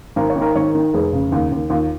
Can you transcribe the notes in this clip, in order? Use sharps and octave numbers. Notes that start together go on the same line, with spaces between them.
G#1 A#4
C#5
D#3
A#4
G#1 C#5
A#4
D#3
F1 G#4
C#3
D#2
D#2
D#2 F4